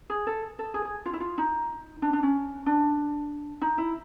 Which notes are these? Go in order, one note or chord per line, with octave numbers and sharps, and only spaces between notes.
G#4
A4
A4
G#4
G#4
F4
E4
F4
D#4
D4
D4
C#4
D4
D#4
E4